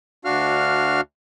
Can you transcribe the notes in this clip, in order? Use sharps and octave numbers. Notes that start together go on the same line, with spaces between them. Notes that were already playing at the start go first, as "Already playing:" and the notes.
D2 D4 F#4 F5 F6